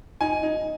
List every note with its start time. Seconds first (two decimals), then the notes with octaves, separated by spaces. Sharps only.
0.21 D#4 G#5
0.43 D#4